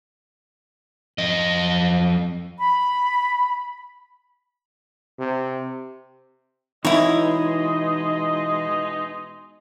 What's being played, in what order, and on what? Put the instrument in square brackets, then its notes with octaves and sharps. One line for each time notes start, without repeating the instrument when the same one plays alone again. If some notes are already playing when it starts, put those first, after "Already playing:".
[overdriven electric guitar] F2 D#5
[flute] B5
[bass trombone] C3
[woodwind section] B2 G#3 D#5 [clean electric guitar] E3 [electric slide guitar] D#4 [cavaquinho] E4 C#5